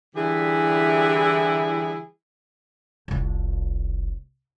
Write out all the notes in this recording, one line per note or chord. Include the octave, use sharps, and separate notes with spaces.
D3 E3 G3 E4 G4 G#4
F1 C2